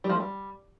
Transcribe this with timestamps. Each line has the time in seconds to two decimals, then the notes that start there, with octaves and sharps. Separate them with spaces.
0.04 G3
0.10 F3
0.15 A3
0.20 G3